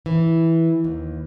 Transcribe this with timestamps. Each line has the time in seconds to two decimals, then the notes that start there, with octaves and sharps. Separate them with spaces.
0.06 E3
0.84 D#2